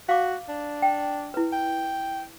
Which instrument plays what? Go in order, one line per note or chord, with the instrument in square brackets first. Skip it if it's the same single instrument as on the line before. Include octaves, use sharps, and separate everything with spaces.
[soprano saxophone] F#4 [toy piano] F5 D6
[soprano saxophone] D4
[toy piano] G5
E4 B4
[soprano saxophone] G5